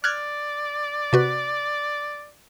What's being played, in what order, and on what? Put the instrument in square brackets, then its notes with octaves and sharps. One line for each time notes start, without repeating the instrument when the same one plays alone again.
[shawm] D5 [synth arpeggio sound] F6 F#6 G#6
[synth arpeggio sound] C3 F#4 B4